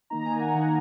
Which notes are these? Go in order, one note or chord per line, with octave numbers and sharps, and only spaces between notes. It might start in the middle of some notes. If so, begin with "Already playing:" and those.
D#3 A#3 D#4 A#5
G#5
F#5
D#3 A#3 D#4